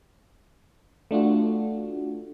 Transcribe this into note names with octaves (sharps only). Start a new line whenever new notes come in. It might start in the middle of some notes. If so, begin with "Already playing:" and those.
A3 D4 F4 F#4